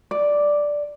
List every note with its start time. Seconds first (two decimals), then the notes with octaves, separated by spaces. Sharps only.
0.11 D5